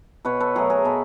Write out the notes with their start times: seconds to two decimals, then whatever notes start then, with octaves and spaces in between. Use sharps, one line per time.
0.25 B2 B4 C#5
0.40 A4 B4
0.55 F#3 A3 G#4 A#4
0.70 G#4 A#4
0.85 B2 A4 B4